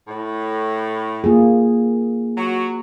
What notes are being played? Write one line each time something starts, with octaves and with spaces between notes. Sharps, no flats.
A2
A#3 F4 G#4
F#3 F#4